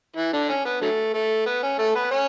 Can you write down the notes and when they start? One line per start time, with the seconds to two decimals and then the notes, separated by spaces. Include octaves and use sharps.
0.16 E3 E4
0.33 D3 D4
0.49 C#4
0.65 B3
0.81 D3 F#3 A3
1.14 A3
1.46 B3
1.63 C#4
1.79 A3 A4
1.95 B3 B4
2.11 C#4 C#5